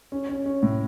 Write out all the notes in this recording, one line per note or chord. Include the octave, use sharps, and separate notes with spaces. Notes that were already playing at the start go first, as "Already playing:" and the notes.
C#4
C#4
C#4
A2